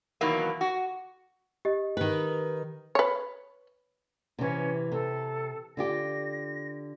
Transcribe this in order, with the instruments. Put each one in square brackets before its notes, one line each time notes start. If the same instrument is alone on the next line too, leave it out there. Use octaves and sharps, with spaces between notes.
[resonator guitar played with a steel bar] B2 D#3 E3 F#3 A#3
F#4
[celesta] G4 D#5
[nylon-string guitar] D#3 B4
[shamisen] B4 C#5
[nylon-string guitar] C3 E3 [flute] C#4
[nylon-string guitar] C3 [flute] A4
[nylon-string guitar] D3 F4 G4 [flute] A#6